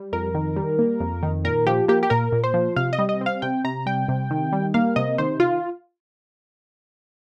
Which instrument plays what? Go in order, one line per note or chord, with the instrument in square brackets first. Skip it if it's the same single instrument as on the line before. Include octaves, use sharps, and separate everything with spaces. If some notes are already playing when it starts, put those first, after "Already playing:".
Already playing: [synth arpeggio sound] G3
F2 A#4
D#3
G3
A#3
F2
D#3
A#2 A#4
F3 G4
A#3 G4
G4
A#2 A#4
A#2
C5
F3
C3 F5
D#5
G3
D#5
C4
F5
C3 G5
C3 A#5
G3 G5
C3
D#3
G3
A#3 F5
C3 D#5
D#3 C5
F4